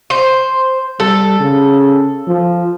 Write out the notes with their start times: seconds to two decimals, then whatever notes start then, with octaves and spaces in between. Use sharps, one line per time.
0.10 C5
1.00 G3 A4
1.40 C#3
2.28 F3